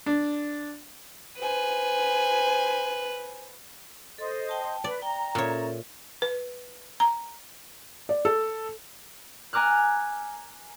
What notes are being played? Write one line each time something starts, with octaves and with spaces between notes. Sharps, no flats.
D4
B4 C5 G#5
A4 C5 D#5
G5 A5
B4 D5
G5 A#5
A#2 C#4 A4 C#5 E5
B4
A#5
D5
A4
G#5 A#5 D6 F6 F#6